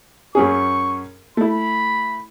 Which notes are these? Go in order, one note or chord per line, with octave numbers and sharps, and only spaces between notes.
F#2 C#4 G#4 C#6
A3 E4 B5